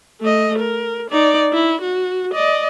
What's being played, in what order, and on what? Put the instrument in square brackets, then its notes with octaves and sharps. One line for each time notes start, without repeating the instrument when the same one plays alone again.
[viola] A3 D#5
A#4
D#4 D5
E4
F#4
D5 D#5